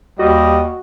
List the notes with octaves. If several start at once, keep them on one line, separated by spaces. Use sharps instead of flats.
D#2 G3 F#4 D#5